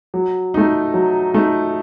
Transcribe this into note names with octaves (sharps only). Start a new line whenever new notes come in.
F#3
A3 D#4
F#3
A3 D#4